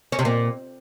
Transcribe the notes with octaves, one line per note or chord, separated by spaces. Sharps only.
C#4
C3
A#2